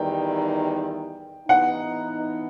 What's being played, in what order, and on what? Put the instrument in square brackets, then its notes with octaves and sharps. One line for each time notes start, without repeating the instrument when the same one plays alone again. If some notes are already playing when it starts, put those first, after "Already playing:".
Already playing: [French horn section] E2 D#3 G3 D#4 [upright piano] G5
[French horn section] E3 B3 D#4 [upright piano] F#5